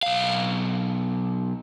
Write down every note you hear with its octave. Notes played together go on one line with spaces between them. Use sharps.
B1 F5